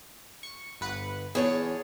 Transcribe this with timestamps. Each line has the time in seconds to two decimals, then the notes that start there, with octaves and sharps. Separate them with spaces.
0.43 C#6
0.81 G1 B4 F#5
1.35 E2 G#4 C#5 A5